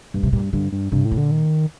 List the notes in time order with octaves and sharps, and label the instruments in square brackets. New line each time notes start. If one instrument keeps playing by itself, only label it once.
[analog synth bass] G2 [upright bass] A#2
[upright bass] C3
[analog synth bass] G2 [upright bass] A#2
[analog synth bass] G2 [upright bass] D3
[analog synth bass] G2
[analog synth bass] G2 [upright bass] C3
[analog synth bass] A2
[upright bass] A#2
[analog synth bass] D3
D#3